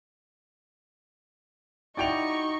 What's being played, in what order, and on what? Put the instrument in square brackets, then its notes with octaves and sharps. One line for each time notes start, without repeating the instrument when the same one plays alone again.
[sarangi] D#4 [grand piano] E4 F#4 [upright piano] D5 G5 F7 [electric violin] C#6